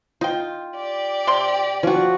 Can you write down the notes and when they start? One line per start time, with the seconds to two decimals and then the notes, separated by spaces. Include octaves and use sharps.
0.21 D#4 F4 G5
0.76 G4 D5
1.27 C3 C6
1.83 F3 C#4 F#4